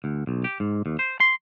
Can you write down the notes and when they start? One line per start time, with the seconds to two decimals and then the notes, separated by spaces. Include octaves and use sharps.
0.04 D2
0.27 B1
0.44 G4
0.60 G#2
0.86 D#2
0.99 C5
1.20 C6